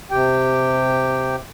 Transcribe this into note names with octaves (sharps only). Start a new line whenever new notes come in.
C3 G4 G5